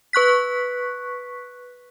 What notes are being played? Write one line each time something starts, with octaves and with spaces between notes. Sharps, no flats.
B4 C#6 F#6 B6